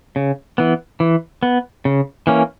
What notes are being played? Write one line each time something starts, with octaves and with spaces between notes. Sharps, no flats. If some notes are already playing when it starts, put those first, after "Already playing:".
C#3
E3 B3
E3
B3
C#3
E3 A#3 C#4